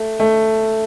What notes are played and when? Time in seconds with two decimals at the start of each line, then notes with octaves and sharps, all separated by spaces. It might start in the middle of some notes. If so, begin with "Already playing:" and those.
Already playing: A3
0.20 A3